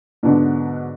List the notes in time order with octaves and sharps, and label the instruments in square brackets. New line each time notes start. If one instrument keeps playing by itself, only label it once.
[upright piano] G#2 B2 D3 D4